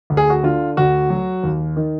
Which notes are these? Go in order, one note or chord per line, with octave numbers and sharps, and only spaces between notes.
D2
G#4
F#4
D3 F4
D2 F#4
F#3
D#2
D#3